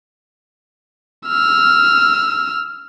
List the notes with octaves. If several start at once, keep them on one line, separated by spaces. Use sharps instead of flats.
E6 F6